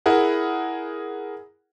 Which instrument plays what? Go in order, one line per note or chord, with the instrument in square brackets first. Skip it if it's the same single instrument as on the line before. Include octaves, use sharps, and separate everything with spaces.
[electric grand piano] E4 G#4 A#4 F#5